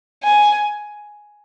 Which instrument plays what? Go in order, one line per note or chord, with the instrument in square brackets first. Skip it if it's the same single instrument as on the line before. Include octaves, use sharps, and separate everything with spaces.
[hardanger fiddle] G#5